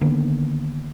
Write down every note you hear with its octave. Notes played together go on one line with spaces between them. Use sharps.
D3 D#3 A#3 B3